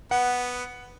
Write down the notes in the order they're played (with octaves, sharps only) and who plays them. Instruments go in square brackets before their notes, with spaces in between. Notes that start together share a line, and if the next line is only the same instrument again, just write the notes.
[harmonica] B3 [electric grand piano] F#5